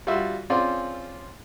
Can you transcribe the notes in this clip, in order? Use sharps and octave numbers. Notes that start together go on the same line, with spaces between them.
G3 F4 F#4 E5
C4 C#4 F4 G#4 D5